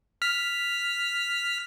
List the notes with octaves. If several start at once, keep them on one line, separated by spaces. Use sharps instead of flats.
F6 B6